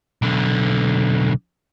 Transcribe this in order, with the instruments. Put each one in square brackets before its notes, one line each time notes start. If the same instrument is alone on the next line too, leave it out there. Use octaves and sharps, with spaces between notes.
[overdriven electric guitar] B1 D3